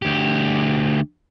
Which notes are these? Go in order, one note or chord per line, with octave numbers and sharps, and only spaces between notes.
D2 G4